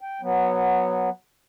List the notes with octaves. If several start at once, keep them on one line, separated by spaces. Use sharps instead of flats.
G5
F#3 B3